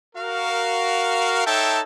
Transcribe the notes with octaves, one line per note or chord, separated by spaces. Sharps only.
F#4 A#4 F5
D#4 A4 C#5 E5 G5 A5